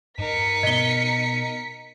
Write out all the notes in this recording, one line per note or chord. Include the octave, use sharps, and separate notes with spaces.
G2 D#4 A#4 B6 C#7
B2 B3 D#5 G7